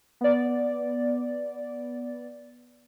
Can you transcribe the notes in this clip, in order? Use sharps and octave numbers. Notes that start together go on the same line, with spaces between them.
B3 D5